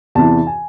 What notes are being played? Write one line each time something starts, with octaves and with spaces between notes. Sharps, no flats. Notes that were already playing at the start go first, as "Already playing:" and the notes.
E2 C3 E3 A5
G#5